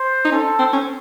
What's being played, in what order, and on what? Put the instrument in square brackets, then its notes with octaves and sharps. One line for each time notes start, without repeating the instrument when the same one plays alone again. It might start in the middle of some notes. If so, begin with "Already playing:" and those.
Already playing: [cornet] C5
[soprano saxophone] D#4
[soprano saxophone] C#4 [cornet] A4
[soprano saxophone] C4
C#4